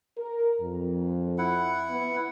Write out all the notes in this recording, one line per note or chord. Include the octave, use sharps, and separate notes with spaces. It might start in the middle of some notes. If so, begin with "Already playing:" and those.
A#4
F2
E4 F#5
B3